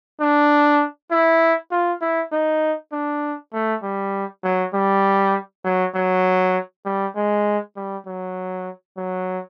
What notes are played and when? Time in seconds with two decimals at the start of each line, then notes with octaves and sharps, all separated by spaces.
0.21 D4
1.11 E4
1.71 F4
2.01 E4
2.32 D#4
2.92 D4
3.53 A3
3.83 G3
4.44 F#3
4.74 G3
5.64 F#3
5.95 F#3
6.85 G3
7.16 G#3
7.76 G3
8.07 F#3
8.97 F#3